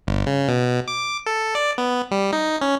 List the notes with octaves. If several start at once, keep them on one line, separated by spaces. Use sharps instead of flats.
G1
C#3
B2
D6
A4
D5
B3
G3
D#4
C#4